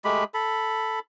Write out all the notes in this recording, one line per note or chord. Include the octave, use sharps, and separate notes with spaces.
G#3 A3 G4 B5
A4 B5